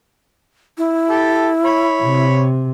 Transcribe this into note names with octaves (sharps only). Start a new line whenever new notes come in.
E4
G4 A4
C#5 B5
C3